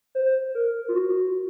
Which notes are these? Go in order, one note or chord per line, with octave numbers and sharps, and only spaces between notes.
C5
A#4
F4
F#4